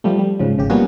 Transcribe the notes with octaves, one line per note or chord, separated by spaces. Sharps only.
F3 G3 A3
G3
G#2 C#3 F3
G#1 C#3 G4
F3 G3 A#3 B3 C#4 F#4